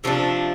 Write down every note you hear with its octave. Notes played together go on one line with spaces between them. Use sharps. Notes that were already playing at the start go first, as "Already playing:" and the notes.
C3 F3 A3 D4